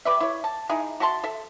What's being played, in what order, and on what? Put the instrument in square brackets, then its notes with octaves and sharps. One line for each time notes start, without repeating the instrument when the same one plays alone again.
[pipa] G4 B4 D5 E5
E4 C#5
A5
D#4 E4 G#4
F#4 E5 A5 C6
A4 E5